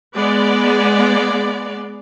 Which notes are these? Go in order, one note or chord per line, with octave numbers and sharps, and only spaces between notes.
G#3 B3 D5